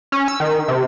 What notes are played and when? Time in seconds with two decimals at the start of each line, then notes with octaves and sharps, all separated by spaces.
0.12 C#4
0.28 E6
0.40 D#3
0.68 C3